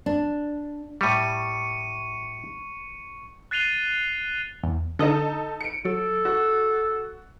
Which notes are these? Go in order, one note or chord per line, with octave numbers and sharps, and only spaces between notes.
D4
A2 G3 C#6 C#7 D#7
F#6 A6 C7 D#7 F7 G7
E2
D3 D#4 A4 D#5
C#7 D7
F#3 A4
F#4